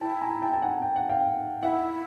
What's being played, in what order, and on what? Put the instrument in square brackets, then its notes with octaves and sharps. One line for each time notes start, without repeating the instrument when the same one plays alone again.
[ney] E4 [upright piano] G5 A5
[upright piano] G#5 A#5
G5 A5
A5
F#5 G#5
G5
F#5
F5 G5
[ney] E4 [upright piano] E5 F#5